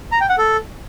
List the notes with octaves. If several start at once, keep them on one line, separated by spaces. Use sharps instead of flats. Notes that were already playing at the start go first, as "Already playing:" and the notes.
A#5
G5
F#5
A4